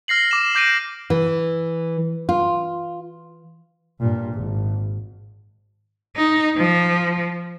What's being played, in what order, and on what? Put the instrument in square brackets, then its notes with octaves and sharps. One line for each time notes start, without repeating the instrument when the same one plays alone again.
[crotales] F6 A#6 C7 F#7
D6 E7
D6 G6 A#6 D7 D#7
[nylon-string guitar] E3
F4
[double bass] G2 A#2
G#1
[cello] D#4
F3